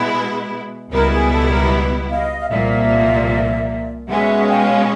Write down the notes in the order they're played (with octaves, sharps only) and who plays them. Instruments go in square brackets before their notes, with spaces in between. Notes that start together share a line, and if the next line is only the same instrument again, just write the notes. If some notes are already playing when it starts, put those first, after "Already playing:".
Already playing: [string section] B2 G#3 B3 E4
[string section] C#2 B2 G3 B3 E4 [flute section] A#4
[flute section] G#4
A4
A#4
D#5 F5
F5
[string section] C2 A#2 F3 A#3 [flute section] D5 E5
[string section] B2 G#3 C#4 [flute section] E5 F#5
[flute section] F5 G5